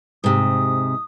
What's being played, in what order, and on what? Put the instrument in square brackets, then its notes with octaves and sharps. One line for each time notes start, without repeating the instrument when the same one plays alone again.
[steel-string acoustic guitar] G#2 C3 [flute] D#6